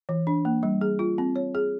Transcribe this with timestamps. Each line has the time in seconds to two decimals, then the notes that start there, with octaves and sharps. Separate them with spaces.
0.09 E3
0.27 D4
0.45 A#3
0.63 G3
0.81 G#4
0.99 F4
1.18 C4
1.36 C#5
1.55 G#4